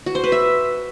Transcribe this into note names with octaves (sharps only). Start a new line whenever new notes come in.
F#4
C5
B4
E5